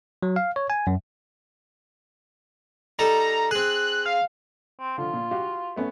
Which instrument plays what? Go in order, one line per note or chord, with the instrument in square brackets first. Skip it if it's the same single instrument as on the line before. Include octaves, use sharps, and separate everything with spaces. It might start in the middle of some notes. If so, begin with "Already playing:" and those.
[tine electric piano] F#3
F5
C#5
G#5
F#2
[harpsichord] G3 D#4 A4 [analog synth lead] A#5
[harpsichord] C4 G#4 [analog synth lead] F#6
[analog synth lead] F5
[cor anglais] C4
[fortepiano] D3 F3 [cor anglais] F4
[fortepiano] A#2
F#4 G4 F5
A3 B3 C#4